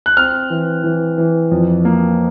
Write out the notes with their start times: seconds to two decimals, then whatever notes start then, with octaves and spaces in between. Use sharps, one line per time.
0.06 F#6
0.17 C4 F6
0.50 E3
0.84 E3
1.18 E3
1.51 F2
1.85 A#3